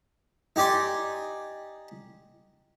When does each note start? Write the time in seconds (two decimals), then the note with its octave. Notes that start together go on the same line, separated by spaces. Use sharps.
0.56 D#4 G4 D5 G#5 C6